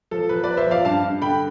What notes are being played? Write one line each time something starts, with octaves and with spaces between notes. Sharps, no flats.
F3 A4
F3 B4
F3 B4 D5
C5 E5
F3 D5 F5
G2 F5 A5
G2
D3 G5 B5